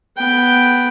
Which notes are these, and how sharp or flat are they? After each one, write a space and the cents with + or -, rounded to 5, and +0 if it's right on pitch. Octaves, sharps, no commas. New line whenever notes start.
B3 +0 G5 +0